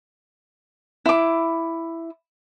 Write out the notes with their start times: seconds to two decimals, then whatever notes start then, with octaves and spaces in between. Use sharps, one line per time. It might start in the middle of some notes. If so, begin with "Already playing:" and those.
1.06 E4 D6